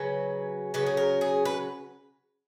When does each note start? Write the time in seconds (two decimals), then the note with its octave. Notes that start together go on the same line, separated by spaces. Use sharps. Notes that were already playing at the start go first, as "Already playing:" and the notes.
Already playing: C#3 F#3 C#4 B4
0.74 C#3 F#3 C#4 B4
0.86 G#4
0.97 A#4
1.21 G#4
1.45 B4